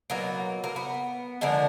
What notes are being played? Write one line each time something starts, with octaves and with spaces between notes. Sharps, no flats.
B2 F#3 A#3
A#3
B3
D3 F3 G#3 A#3